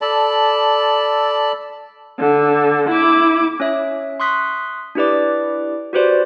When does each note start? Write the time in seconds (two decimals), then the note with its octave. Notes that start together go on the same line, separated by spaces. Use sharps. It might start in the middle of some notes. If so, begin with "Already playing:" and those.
0.01 A4 D5 A5 B5
2.20 D3
2.90 E4 D6
3.60 C#4 C#5 E5
4.20 C6 C#6 D#6 F#6 B6
4.95 D4 E4 G4 B4 D5 D6
5.93 F#4 G4 B4 C5 D5